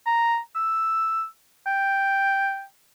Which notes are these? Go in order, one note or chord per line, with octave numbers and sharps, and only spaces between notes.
A#5
E6
G5